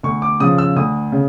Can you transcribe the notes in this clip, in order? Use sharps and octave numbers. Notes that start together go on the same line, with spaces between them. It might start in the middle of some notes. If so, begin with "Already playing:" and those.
D2 C#6
D6
C#3 F3 D#6
E6
D2 D#6
C#3